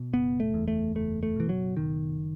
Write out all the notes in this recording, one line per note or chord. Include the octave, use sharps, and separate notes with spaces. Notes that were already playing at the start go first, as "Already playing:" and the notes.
Already playing: B2
F#1 B3
A3
E2
A3
F#1 A3
A3
B2 E3
F#3
F#1 D#3